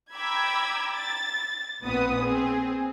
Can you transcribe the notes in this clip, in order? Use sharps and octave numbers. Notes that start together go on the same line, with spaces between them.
G5 A#5 B5 D6 E6 G#6
A6
A#1 A#2 B3 C4 D#6
C4 G#4